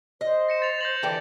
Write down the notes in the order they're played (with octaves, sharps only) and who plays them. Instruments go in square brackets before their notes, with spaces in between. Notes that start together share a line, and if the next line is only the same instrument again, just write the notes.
[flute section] C5 [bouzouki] D#5
[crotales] A#6 C#7 E7
A6 F7
G6 A#6 F#7
[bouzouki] D3 E3 G4 [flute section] G5